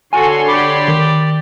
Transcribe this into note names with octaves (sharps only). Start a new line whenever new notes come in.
D3 F#4 A4 C#5 F#5 G#5 C6
G4 D5 B5 D6
D#3